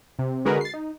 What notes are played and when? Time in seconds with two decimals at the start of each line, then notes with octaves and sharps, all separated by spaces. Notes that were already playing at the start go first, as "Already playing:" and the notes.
0.19 C3
0.45 D3 G#3 F#4 G#4 A#4 B4
0.61 A6 C7
0.74 D#4